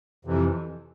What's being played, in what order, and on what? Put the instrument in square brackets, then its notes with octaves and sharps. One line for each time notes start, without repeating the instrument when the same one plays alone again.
[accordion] F2 C3 E3